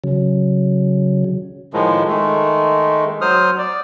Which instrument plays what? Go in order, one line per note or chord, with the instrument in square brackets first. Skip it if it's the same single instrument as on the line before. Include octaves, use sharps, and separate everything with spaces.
[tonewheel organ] C#3 F#3
[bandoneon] A2 D#3 F3 G#3
D#3 G#3 A3
F#3 C5 D#6 F6
D5